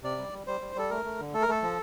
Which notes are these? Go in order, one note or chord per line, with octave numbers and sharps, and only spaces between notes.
C3 D5
G3
G3
G3 C5
G3
G3 A4
A3 A#4
A3
D3
A3 A4
A#4
A3 A4
F3